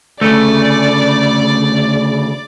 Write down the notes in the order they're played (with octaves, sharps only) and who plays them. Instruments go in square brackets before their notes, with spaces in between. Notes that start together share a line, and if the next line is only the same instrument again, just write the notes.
[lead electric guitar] D2 C#3 [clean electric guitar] A3 [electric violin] D5